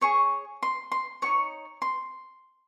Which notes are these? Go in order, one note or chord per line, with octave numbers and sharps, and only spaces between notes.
G#4 C#5 C#6
C6
C6
D#4 F#4 C#5 C#6
C6